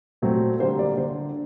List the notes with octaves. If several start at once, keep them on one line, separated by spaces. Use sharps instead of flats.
A#2 F#3 A3 C4
D3 G3 A#3 C5
D5
D3 C5